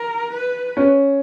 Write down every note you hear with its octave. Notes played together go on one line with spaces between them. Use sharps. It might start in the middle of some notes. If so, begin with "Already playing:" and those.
Already playing: A#4
B4
C#4